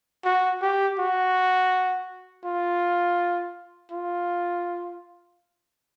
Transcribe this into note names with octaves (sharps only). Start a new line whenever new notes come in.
F#4
G4
F#4
F4
F4